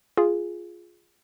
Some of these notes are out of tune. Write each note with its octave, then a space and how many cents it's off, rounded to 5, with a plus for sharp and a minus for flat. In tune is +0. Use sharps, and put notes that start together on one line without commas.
F4 +0 G#4 +0